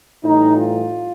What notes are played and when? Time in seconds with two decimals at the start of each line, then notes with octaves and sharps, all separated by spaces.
0.24 A2 E3 G3 D#4
0.55 F4